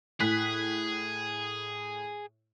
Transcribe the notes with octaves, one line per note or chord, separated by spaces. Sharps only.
A2 G#4 F#6 B6